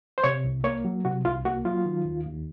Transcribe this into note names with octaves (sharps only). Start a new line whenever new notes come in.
C5
C3 C#5
C2
A#3 C#5
F#3
C3 F#4
C2 F4
A#3 F#4
F#3 F4
D#3
D#2
D#2